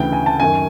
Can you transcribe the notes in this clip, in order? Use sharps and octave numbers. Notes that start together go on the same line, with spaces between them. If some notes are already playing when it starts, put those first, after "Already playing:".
Already playing: D2 C#3 E3 G5
G#5
A5
F#2 D#3 G#5